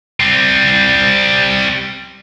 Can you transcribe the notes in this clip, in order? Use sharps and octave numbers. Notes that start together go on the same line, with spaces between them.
G3 C4